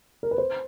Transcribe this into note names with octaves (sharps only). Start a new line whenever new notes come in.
A#4
B4
C5